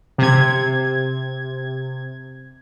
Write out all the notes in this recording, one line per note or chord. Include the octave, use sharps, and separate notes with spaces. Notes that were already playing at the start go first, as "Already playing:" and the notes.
C3 G#6